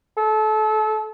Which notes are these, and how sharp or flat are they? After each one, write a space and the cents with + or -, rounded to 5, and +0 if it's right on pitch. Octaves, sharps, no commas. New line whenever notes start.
A4 -30